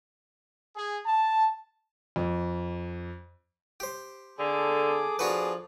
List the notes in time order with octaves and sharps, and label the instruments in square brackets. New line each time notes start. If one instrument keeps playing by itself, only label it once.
[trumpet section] G#4
A5
[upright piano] F2
[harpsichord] G4 C5
[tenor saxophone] D3 [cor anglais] G#4 [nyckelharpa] A4 D6
[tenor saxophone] F3 [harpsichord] D4 F#4 B4 [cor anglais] G#4